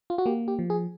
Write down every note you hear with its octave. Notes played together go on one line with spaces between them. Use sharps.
F4
F#4
A#3 G4
G4
F3
G#4